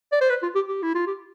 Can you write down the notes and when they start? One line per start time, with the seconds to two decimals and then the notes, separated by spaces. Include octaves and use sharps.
0.12 D5
0.21 C5
0.30 B4
0.43 F4
0.55 G4
0.68 G4
0.82 E4
0.95 F4
1.07 G4